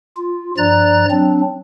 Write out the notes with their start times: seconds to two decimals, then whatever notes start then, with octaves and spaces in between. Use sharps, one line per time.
0.16 F4
0.58 G2 F3 D5 A#5 F#6 A6
1.10 F#3 C4 D4